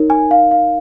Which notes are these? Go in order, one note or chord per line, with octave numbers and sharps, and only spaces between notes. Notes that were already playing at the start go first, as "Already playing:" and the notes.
Already playing: D#4 A#4 C#5
G#5
F5
F5